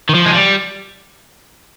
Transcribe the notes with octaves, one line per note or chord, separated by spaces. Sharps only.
D#3
F3
G#3
G3